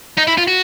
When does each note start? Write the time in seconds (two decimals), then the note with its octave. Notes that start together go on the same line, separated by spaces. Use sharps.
0.17 D#4
0.27 E4
0.38 F4
0.48 F#4